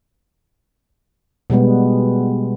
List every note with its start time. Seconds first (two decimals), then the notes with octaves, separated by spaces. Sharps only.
1.50 B2 G3 G#3 B3